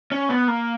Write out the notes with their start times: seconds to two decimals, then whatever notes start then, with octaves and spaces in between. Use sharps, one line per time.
0.12 C#4
0.29 B3
0.48 A#3